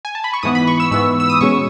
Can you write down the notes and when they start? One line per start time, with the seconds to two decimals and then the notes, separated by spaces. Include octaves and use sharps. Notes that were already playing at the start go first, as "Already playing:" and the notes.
0.05 G#5
0.15 A5
0.24 B5
0.33 C#6
0.43 G#2 E3 B3 D#6
0.55 B5
0.67 C#6
0.80 E6
0.91 G#2 E3 B3 E6
1.20 E6
1.30 D#6
1.41 B2 G#3 C#4 C#6